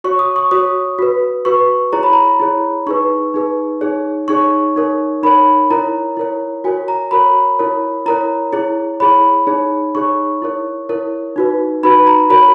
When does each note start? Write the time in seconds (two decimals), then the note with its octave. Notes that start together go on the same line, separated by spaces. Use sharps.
0.04 F#4 C#5 C#6
0.19 D#6
0.36 C#6
0.51 F#4 C#5 D#6
0.99 F#4 B4
1.45 F#4 B4 C#6
1.92 E4 G#4 C#5 A#5
2.03 B5
2.13 A#5
2.40 E4 G#4 C#5
2.86 D#4 G#4 B4 C#6
3.34 D#4 G#4 B4
3.81 D#4 G#4 C#5
4.28 D#4 G#4 C#5 C#6
4.76 D#4 A#4 C#5
5.23 D#4 A#4 C#5 B5
5.70 E4 A#4 C#5 A#5
6.17 E4 A#4 C#5
6.64 F#4 A#4 C#5 G#5
6.88 A#5
7.11 F#4 A#4 C#5 B5
7.59 E4 A#4 C#5
8.06 E4 A#4 C#5 A#5
8.52 E4 G#4 C#5
9.00 E4 G#4 C#5 B5
9.47 D#4 G#4 C#5
9.95 D#4 G#4 C#5 C#6
10.42 E4 A#4 C#5
10.89 E4 A#4 C#5
11.36 D#4 F#4 B4
11.83 D#4 F#4 B4 B5
12.07 A#5
12.30 F#4 A#4 C#5 B5